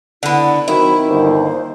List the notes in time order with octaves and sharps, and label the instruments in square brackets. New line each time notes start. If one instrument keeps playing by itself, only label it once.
[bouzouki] D3 B3 [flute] E4
[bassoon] D#3 [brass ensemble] F#3 C4 [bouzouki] E4 [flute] B5
[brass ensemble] G1 D#2 [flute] C5